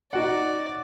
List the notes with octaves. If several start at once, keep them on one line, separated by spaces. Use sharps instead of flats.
D#4 F#4 D5 F#5